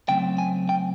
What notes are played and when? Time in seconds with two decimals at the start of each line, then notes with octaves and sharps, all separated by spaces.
0.09 C#3 F#3 A3 C4 G5
0.38 G#5
0.69 G5